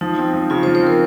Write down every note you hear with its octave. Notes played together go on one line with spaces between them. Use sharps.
F3 D#4
C4
F3
C#3 F4
C5
F3
C5
C4 A#4